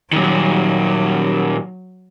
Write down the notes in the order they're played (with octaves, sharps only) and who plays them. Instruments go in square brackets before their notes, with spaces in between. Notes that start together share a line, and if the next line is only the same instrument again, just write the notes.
[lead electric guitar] A#2 D#3 [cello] F#3